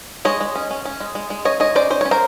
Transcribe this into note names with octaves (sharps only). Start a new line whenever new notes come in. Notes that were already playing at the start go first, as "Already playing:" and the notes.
G#3 C#5 D#5
G#3
C#4
C#4
C#4
G#3
G#3
G#3
C#4 C#5 D#5
G#3 C#5 D#5
C#4 C5 D5
C#4 C5
C#4 C#5
A#4 C5